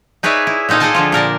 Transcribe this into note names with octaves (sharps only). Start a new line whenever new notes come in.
D#4 G#4 B4 C#5 D5 E5
E4
A#2 C4 D#4 A4 F5
G#4 A4 D5 D#5 G#5 A5
D3 F3 F4
A#2 A#4 D5 A5